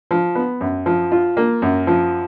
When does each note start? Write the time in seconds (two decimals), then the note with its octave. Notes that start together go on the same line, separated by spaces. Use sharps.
0.11 F3
0.35 B3
0.61 F#2
0.86 F3
1.12 F4
1.37 A#3
1.62 F#2
1.87 F3